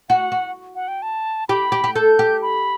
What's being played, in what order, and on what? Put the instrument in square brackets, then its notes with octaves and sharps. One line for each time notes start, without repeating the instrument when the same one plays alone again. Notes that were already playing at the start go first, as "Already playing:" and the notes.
[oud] F#4 [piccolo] F#5
[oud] F#4
[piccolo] F#5
G5
A5
[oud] G4 [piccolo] B5
[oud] G4
G4
[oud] A4 [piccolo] G6
[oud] G4
[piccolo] B5